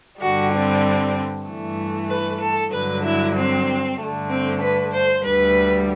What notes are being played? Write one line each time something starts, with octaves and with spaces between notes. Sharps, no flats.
G2 D3 G3 F#4
C4
G2 E3 A3
B4
A4
G2 D3 F#3 B4
E4
C4
G2 D3 A3
C4
B4
C5
D2 D3 G3 B4